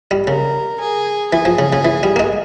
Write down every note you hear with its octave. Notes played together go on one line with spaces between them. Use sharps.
G3
C#3 A#4
G#4
E3 G#4
F3
C#3
C#3
E3
G3
A#3
G#3